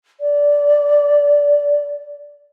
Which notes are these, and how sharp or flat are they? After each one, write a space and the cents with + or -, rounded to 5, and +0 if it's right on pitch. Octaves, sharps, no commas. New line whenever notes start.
D5 -15